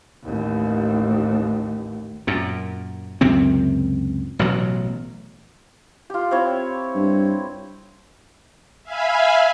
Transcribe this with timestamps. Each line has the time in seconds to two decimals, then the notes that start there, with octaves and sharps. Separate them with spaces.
0.24 A1 D#2
2.27 F#2 A#2
3.21 C#2 F#2 C3 C4
4.39 A1 B2 F#3
6.10 F4 G4
6.31 C4 E4 C#5
6.95 G2
8.84 E5 F5 G#5 B5